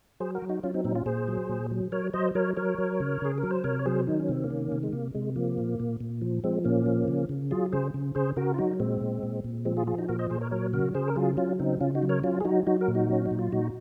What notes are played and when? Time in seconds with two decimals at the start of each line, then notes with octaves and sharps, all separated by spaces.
0.20 F#3 G#4 C5
0.35 F#4 A#4
0.42 F#3
0.49 D#4 F#4
0.63 F#3 C#4 F4
0.74 C4 D#4
0.84 A#2 C4 D#4
0.95 C#4 F4
1.06 A#2 G#4 C5
1.28 F#3
1.49 A#2
1.71 F#3
1.92 F#3 A#4 C#5
2.14 F#3 C5 D#5
2.35 F#3 A#4 C#5
2.56 F#3 A#4 C#5
2.78 F#3
3.00 C#3
3.22 C#3 G#4
3.38 A#4
3.43 F#3
3.51 C5
3.64 C3 A#4 C#5
3.79 C#5
3.86 F#3 G#4 C5
4.07 D#3 D#4
4.19 C#4
4.29 C3 C4
4.44 A#3 C#4
4.50 D#3
4.72 C3
4.83 G#3
4.93 C3 A#3
5.15 C3 G#3
5.36 F3 A#3
5.58 A#2
5.80 A#2
6.00 A#2
6.21 F3
6.44 F3 G#3 C4
6.64 A#2 A#3 C#4
6.86 F3
7.08 C#3
7.29 C#3
7.51 F#3 F4 G#4
7.72 C#3 G#4 C5
7.94 C#3
8.15 C#3 G#4 C5
8.36 C#3 F#4 A#4
8.54 F4
8.58 F#3 D#4 F#4
8.80 A#2 G#3 C4
9.01 A#2
9.23 A#2
9.44 A#2
9.65 F3 G#3 C4
9.77 F4 G#4
9.87 F3 F4 G#4
9.98 D#4 F#4
10.08 A#2 F#4 A#4
10.19 C5 D#5
10.30 A#2 G#4 C5
10.41 A#4 C#5
10.51 F#3 A#4 C#5
10.73 C#3 F#4 A#4
10.94 C#3 G#4 C5
11.08 A#4
11.16 F#3 F4 G#4
11.37 F#3 C#4 F4
11.59 C#3 C4 D#4
11.80 C#3 C#4 F4
11.95 D#4 F#4
12.02 F#3
12.09 A#4 C#5
12.24 F#3 C#4 F4
12.40 G#4
12.45 F#3 D#4 F#4
12.67 F#3 D#4 F#4
12.81 F#4 A#4
12.88 A#2
12.95 D#4 F#4
13.09 F#3 C#4
13.26 D#4
13.31 A#2
13.39 F4
13.52 A#2 D#4 F#4